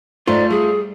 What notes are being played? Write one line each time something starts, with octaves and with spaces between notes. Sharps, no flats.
G#2 A3 F4 D5
G3 G#4